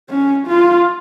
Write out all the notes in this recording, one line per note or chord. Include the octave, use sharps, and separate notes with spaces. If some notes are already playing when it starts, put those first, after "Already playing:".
C#4
F4